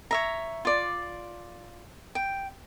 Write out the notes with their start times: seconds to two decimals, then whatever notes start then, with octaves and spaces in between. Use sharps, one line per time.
0.11 C#5 E5 A#5
0.65 F4 D5
2.15 G5